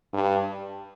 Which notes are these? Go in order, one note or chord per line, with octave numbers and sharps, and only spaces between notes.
G2